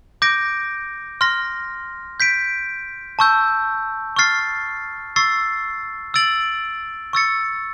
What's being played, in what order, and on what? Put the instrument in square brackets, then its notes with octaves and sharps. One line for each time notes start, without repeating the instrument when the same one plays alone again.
[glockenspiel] D6 G6 A#6 D7
C6 F6 A#6
G6 B6 D7
A5 C#6 E6 G6
C#6 F6 A6 C7
C#6 E6 A6 C7
E6 A6 D7 F#7
C#6 E6 A6 C#7